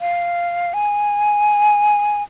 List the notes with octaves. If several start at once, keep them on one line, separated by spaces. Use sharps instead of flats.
F5
G#5